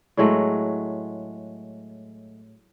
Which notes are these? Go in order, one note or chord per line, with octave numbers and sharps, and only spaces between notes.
A2 F#3 G#3 A3